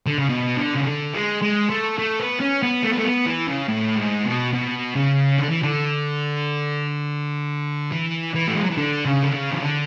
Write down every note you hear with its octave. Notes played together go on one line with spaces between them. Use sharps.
D3
C#3
B2
D3
C#3
D3
G#3
G#3
A3
A3
B3
C#4
B3
A3
B3
A3
B3
E3
C#3
A2
G#2
B2
B2
C#3
D3
E3
D3
E3
E3
A3
G#3
F#3
E3
D3
C#3
D3
C#3
E3
D3